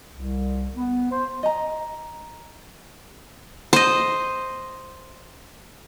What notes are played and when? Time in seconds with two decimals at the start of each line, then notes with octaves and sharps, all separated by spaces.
0.15 C2
0.76 B3
1.11 C5
1.43 D#5 A#5
3.73 C5 D#5